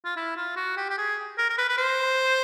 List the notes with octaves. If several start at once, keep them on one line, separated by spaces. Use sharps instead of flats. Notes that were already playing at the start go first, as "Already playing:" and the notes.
F4
E4
F4
F#4
G4
G4
G#4
A#4
A#4
B4
B4
C5